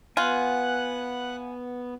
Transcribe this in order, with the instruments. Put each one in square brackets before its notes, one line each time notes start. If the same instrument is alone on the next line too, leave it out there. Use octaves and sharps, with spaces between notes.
[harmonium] B3 [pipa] F4 [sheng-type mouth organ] B4 F#5 F#6 [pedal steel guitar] G#5